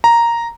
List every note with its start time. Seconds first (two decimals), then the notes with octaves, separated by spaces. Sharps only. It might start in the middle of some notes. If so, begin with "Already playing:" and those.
0.04 A#5